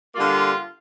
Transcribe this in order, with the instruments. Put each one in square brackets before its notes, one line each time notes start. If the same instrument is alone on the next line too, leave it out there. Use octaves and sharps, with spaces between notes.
[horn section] D3 G3 A#3 F4